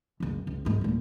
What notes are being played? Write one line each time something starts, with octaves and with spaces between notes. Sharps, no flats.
F#1 C#2
C#2
F#1 G#2
D#1 A#2